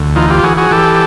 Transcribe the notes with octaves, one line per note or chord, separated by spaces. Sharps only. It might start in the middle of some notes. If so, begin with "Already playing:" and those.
Already playing: D2
E3 D#4 F4
F4 G4
E3 F#4 G#4
F#4 G#4
E3 G4 A4